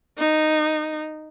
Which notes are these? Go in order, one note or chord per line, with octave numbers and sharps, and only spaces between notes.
D#4